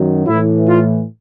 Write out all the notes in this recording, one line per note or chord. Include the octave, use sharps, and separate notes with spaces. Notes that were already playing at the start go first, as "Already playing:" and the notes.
Already playing: F#2 D#3 F#3
A2 E3 E4
F4